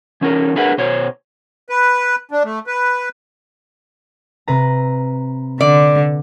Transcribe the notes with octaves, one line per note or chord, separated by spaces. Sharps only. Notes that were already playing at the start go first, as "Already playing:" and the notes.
E3 C#4 D#4 G4 A#4
D4 G#4 A#4 B4 E5 F#5
B2 C5 C#5
B4
D4
A3
B4
C3 B4 A#5
D3 D5